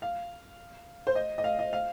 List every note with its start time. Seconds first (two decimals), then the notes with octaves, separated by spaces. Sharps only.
0.02 F5
1.07 C5
1.15 D#5
1.38 D#5
1.44 F5
1.59 D#5
1.73 F5